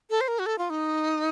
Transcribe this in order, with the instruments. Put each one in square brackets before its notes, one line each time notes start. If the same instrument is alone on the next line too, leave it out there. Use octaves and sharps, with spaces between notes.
[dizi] A4
C5
A#4
F#4
A4
F4
D#4